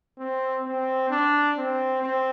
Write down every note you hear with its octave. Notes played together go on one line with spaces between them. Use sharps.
C4
C4
D4
C4
C4